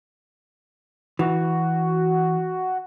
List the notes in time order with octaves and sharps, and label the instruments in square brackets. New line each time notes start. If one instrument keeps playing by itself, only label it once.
[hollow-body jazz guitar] E3 [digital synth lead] F#4